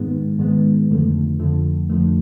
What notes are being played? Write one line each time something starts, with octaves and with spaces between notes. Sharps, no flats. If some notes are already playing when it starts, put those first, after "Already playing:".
Already playing: G#2 D#3 G#3 B3
G#2 D#3 G#3 B3
F2 D3 F3 A3
F2 D3 F3 A3
F2 D3 F3 A3